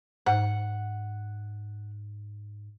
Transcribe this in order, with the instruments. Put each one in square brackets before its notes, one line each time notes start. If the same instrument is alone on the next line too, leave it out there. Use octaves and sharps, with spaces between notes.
[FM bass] G#2 [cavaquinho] F#5